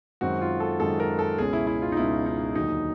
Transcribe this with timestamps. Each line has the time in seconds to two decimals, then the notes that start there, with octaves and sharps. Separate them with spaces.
0.21 F#2 D#3 G#3 C4 F#4
0.41 F4
0.60 A4
0.80 F#2 D#3 G#3 C4 A4
1.00 A#4
1.19 A4
1.38 C#2 B2 G#3 C#4 G#4
1.53 E4
1.67 E4
1.82 F4
1.92 D#4
1.96 C#2 B2 G#3 C#4 E4
2.26 D#4
2.55 D#2 D3 F#3 D#4